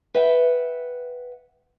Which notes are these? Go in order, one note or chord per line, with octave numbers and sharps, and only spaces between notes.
B4 E5 F#5 G5